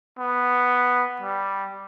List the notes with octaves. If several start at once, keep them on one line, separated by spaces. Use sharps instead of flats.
B3
G3